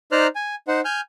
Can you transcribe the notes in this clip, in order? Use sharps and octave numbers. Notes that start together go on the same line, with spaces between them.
D#4 C5 D5 A#5 F6 F#6
G#5
D#4 C5 F#5
G#5 F6 G6